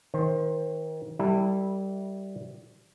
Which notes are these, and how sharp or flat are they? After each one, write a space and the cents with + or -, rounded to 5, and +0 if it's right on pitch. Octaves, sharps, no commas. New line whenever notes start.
D#3 +30 C5 +25
G3 -15 E4 -15 A4 +45